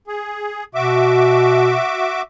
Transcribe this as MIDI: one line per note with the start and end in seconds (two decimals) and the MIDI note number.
0.07 0.64 68
0.75 1.77 47
0.75 2.22 66
0.75 2.22 76
0.75 2.22 86